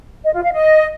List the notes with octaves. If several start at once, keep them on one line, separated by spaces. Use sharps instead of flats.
D#5
F4
F5
D#5